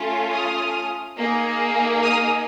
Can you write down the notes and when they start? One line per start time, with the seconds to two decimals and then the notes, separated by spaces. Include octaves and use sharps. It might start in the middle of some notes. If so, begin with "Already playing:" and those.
Already playing: A3 C#4 F4
0.31 D#6 F6
1.17 A#3 D#4 G#4
2.02 D#6 F6